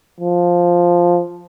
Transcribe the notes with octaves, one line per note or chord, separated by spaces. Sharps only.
F3